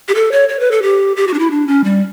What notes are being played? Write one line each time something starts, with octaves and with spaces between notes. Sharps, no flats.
G4
A4
C#5
C#5
B4
A4
G4
G4
F#4
D4
E4
D4
C#4
G3